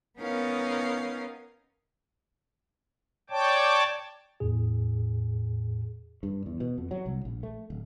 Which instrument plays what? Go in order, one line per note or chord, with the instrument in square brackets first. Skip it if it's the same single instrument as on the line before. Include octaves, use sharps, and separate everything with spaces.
[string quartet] B3 C#4 D#4 A#4 F5
[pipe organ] C#5 D5 G5 A5 D6
[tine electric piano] E2 A2 G#4
[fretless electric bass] G2
E2
B2
F2
F#3
C2
A#1
A3
D1